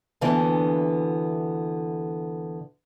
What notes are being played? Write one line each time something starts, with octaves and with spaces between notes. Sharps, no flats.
D2 A#2 D3 E3 B3 F5